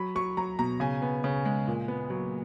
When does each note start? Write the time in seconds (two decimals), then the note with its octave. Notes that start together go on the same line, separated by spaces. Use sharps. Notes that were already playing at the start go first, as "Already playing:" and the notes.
Already playing: F#3 B5
0.15 F#3 C#6
0.37 F#3 A#5
0.59 B2 A#5
0.80 C#3 G#5
1.02 B3
1.24 C#3
1.45 G#3
1.68 A#2
1.88 B3
2.10 F#3